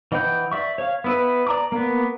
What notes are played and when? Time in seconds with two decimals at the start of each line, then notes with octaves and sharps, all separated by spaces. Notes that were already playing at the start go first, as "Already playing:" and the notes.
0.12 E3 D#5 F#5 G5 G6
0.52 D5 E5 C#6
0.78 C#5 F5
1.04 B3 E4 B4
1.47 D5 A#5 D6
1.72 A#3 B3